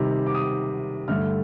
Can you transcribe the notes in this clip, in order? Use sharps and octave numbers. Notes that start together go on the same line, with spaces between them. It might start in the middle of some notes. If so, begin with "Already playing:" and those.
Already playing: C3 D#3 G3
D6
D#6
G2 D3 A3 F6